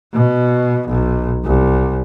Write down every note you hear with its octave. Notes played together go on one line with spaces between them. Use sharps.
B2
B1
C2